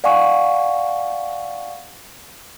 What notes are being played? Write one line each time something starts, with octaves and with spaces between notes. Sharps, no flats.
D5 F5 F#5 G#5 C#6